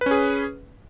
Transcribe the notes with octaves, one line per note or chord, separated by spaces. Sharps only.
C#4 G#4 B4